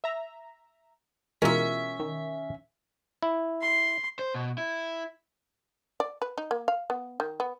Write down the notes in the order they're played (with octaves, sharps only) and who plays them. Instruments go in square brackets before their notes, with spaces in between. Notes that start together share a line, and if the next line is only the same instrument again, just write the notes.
[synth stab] E5 A#5
[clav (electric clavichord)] B2 E3 G#3 [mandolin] C#4 E5 [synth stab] F4 A#4
[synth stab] D#3
[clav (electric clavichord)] E4
[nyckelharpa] C6
[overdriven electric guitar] C5
B2
E4
[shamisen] D5
B4
D#4
A#3
F5
B3
D#3
B3